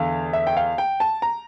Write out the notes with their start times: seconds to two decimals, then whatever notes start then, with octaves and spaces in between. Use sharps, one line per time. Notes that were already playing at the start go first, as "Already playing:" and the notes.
Already playing: E2 D3 F5
0.33 E5
0.47 G5
0.57 F5
0.78 G5
1.00 A5
1.22 A#5